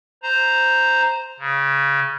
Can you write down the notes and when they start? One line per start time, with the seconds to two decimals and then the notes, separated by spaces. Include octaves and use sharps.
0.23 C5 A#5
1.40 C#3